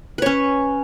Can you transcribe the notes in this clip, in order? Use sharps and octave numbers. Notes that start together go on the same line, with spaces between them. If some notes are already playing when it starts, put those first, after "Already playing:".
C#4 B4 C#5